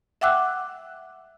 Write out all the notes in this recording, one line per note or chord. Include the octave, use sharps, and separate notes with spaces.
E5 F#5 G5 D6 E6 F#6